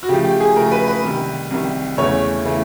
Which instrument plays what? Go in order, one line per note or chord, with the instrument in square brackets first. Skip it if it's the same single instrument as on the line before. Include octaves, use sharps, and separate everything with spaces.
[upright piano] F#4
C#3 F3 A3 G4
G4
G#4
C#3 F3 A3 A#4
B4
B4
C2 C3 D#3
C2 C3 D#3
E2 C#3 E3 A3 C#5
C#3 E3 A3